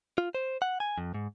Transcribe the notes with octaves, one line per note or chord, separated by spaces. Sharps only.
F4
C5
F#5
G#5
F2
G#2